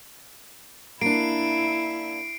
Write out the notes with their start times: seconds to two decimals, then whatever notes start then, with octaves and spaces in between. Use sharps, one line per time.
1.01 A#3 D4 E4 C7 D7